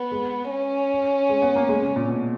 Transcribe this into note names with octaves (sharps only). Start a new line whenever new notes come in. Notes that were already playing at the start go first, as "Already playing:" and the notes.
Already playing: B3
G#3
C#4
G#3
B3
A#3
G#3
C#3
A#2
B2